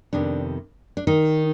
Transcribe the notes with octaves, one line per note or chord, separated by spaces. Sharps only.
F2 C3 D#3 B3 D4
D4
D#3 D#4